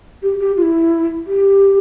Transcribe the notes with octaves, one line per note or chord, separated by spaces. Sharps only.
G4
G4
F4
E4
G4